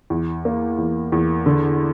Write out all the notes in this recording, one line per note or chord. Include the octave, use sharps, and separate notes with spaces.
E2
A#3
E2
E2
D3